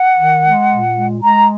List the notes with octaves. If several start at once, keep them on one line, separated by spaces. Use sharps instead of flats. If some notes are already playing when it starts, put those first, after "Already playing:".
Already playing: F#5
D#3
G#3
A#2
G#3
G#3 A#5